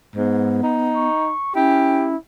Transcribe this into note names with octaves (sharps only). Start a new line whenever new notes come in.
G#2 B3
D#4
C#6
C#4 E4 G4